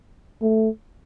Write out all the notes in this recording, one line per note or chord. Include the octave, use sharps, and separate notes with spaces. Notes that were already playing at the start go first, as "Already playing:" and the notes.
A3